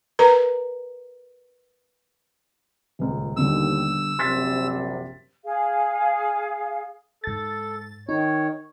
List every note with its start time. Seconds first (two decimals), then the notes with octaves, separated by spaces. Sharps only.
0.19 A#4 B4 A#5
2.99 D#1 C#2
3.37 D#2 B2 D3 G3 E6
4.19 A#1 F#2 C3 C6 A6 B6
5.45 G#4 F5
7.24 G#2 A4 A6
8.09 D#3 D#4 C#5